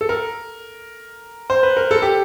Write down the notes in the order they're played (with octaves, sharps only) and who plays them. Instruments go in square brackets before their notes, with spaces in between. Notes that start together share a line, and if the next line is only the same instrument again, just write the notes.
[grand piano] A4
A#4
C5
B4
A#4
A4
G4